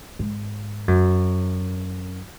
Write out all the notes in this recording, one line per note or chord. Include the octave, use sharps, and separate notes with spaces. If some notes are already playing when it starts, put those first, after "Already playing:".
G#2
F#2